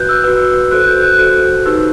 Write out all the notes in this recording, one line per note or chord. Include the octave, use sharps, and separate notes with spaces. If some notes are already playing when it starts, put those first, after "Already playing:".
Already playing: F#4 B4 F#6 G6
E6
F#4 B4
F#4 A4 C5 F#6
G6
F#6
F#4 A4 C5 F#6
D#4 G4 B4 E6